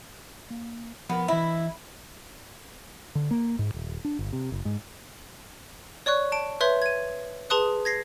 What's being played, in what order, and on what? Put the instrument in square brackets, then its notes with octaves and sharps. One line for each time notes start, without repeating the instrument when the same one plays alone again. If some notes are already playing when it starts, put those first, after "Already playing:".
[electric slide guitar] A#3
[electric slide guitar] F3 A#4 [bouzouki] B3
[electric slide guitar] E3 D#5 E5 [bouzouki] E4
[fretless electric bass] D3
A#3
G#2
D#1
D4
G1
C3
F#1
G#2
[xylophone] C#5 D5 C#6 F#6
A5 D7
B4 C#5 E5 C6 G6
G#6 D#7
G#4 B4 A5 C6 D#6 F#6
G#6 A#6 C7